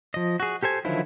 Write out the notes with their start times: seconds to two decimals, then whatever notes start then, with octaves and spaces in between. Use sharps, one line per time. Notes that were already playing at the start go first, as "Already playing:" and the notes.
0.14 F3 D#5
0.40 F#4 G#4
0.63 G4 A4 C5 G#5
0.85 D3 D#3 F3 F#3 E4